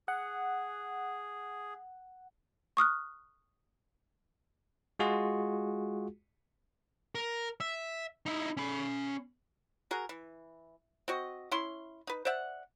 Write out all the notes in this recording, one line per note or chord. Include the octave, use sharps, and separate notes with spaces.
G#4 F#5
C#6 D#6 F6 F#6
G#3 F4 F#4 G#4
A#4
E5
D#4 E4
C#4 B5
F#4 G#4 A#4
E3
C4 F#4 D#5
C#4 E4 C6
D#4 B4
C5 D5 E5 F#5